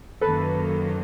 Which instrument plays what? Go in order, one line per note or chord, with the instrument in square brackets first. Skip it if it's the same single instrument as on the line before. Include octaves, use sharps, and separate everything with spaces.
[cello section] F#2 D#3 F#3 A#3 [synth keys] A4 B4